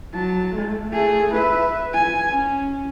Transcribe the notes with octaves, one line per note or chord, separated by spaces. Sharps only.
F#3 A5
A3
A3 G#4
B4 E5
G#5
C#4